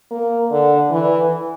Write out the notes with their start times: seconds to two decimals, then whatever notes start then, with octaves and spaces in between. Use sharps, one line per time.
0.11 A#3
0.51 D3
0.91 E3